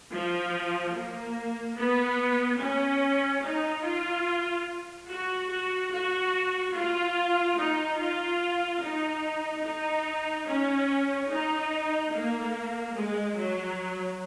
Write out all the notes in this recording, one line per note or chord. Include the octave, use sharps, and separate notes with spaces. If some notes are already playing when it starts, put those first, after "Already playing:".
F3
A#3
B3
C#4
D#4
F4
F#4
F#4
F#4
F4
D#4
F4
D#4
D#4
C#4
D#4
A#3
G#3
F#3